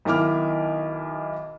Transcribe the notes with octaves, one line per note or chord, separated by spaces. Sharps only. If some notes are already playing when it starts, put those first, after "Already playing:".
B1 D#3 E4 D6 F6